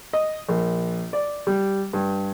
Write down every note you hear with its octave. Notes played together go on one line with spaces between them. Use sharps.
D#5
A#1
D5
G3
G2